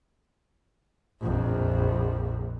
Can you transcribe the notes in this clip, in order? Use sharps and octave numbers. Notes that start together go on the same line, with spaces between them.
A#1 F2